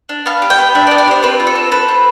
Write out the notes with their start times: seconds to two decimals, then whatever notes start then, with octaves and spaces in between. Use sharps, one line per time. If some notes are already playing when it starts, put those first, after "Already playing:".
0.09 D4
0.26 B3 F5
0.42 G4
0.50 G5
0.58 B3
0.75 D4 E5
0.87 D5
0.91 B3
0.98 D5
1.07 G4 C5
1.23 C4 B4
1.40 F4
1.47 A4
1.55 C4
1.71 A4 B4
1.88 C4